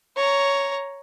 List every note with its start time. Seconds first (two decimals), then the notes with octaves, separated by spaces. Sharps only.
0.17 C#5 A#5